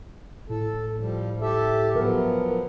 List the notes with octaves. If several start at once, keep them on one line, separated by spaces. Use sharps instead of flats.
A2 A4
F3 G3
G4 A4 E5
F3 F#3 B3 A#4